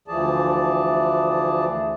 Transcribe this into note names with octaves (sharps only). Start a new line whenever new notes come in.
D2 E3 F3 G#4 D5 A5